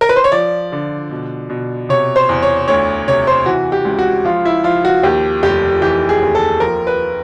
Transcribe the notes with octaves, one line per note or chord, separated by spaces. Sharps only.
A#4
B4
C5
C#5
F3 D5
D3
B2
B2
C3 C#5
C5
E2
C#5
D2 C#5
C3 C#5
C5
E3 F#4
G4
C#2
F#4
F3 F4
E4
F3 F4
F#4
D#2 G4
F1 G4
E3 G4
G#4
D#2
A4
F3 A#4
B4